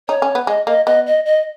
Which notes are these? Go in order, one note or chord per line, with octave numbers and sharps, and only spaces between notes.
D#4 C#5
C#4
B3
G#3 D#5
A#3 D#5
B3 D#5
D#5
D#5